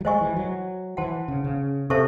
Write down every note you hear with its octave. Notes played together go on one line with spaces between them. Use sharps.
F#3
G#3 C5 D#5 G#5 C#6
E3
F#3
E3 C5 F#5 A5 C6
C#3
C#3
C3 A4 C5 E5 A5 C#6